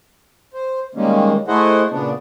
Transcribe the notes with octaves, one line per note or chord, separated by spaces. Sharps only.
C5
D#3 G3 G#3 A#3 C#4
A3 E4 G#4 C5 D#5 F#5
A#2 C#3 B3 D4